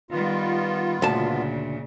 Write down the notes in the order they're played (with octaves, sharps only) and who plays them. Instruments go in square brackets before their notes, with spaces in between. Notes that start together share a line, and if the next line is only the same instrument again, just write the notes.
[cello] D#3 G3 [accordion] B3 F4
[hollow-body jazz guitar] D2 A5 [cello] A#2 C#3